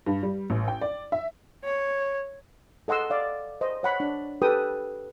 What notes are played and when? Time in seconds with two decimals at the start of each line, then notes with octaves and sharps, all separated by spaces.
0.06 G2
0.23 G3
0.50 A1
0.68 G5
0.81 D5
1.12 E5
1.64 C#5
2.88 A4 D#5 F#5 C6 E6
3.10 D5 F5
3.61 C5 D#5
3.83 C#5 F#5 B5
4.00 D4
4.42 G4 A4 B4 G5 D#6